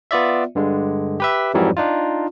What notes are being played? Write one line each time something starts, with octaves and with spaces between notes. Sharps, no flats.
B3 F4 D5 E5
G2 D3 G#3
G4 B4 E5
F2 G#2 E3 F#3 G3
D4 D#4 F4